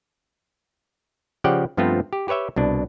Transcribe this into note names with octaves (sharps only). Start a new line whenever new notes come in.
C#3 F3 G4 D5 F#5 G5
G2 F3 A3 B3 C4 F4
G4
G4 B4 C#5 E5 G5
C2 B2 D4